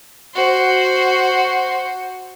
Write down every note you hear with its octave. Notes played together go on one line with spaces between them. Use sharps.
F#4 C5